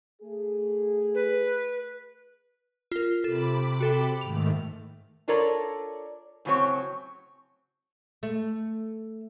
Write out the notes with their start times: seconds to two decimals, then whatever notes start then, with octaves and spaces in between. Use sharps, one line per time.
0.22 A3 G#4
1.15 B4
2.92 F4 A#4
3.24 C3 A4 B5 D6
3.80 F#4 A4 G5
4.21 G#2 D#3 A3 F7
5.28 D4 F4 A4 A#4 C#5 D5
6.45 A2 C#3 F#3 C4 C#5
8.23 A3